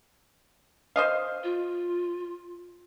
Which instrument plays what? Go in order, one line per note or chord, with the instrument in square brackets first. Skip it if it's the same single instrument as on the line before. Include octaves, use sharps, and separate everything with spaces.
[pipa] C5 D#5 F5
[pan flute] F4